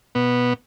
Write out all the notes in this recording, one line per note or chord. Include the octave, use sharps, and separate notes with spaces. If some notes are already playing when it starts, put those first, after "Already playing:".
B2 B3